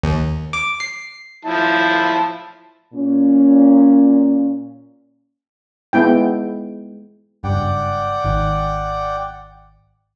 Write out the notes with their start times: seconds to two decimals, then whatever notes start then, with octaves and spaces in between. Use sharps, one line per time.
0.03 D#2
0.53 D6
0.80 C7
1.45 F3 E4 A5
2.94 A#2 C#4
5.93 G#3 B3 E4 G5
7.44 F#1 G2 D5 F#5 G5
8.24 G#1 D#3